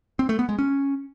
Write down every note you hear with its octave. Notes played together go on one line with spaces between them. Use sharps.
C4
A3
B3
G#3
C#4